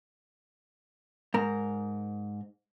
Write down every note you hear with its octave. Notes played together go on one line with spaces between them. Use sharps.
G#2 A#4